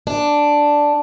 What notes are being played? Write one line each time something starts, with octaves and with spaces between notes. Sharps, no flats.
D4